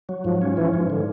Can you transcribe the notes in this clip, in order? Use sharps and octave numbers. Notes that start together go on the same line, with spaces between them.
F#3
G#2 F3
C#4
E3 F3
G#2
D3